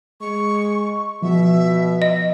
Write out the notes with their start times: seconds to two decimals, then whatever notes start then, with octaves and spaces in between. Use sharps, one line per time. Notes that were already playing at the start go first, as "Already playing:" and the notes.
0.21 G#3 C#6
1.23 B2 F3 E5
2.02 D#5